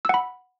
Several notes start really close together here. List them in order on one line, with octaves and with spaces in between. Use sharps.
E6 F#5 B5